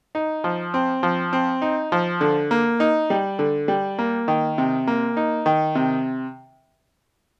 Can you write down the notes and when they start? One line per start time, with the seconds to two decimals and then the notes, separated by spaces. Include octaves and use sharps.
0.15 D#4
0.44 F3
0.74 C4
1.03 F3
1.33 C4
1.62 D#4
1.92 F3
2.21 D3
2.51 A#3
2.80 D#4
3.10 G3
3.39 D3
3.68 G3
3.99 A#3
4.28 D#3
4.58 C3
4.87 A#3
5.17 D#4
5.46 D#3
5.75 C3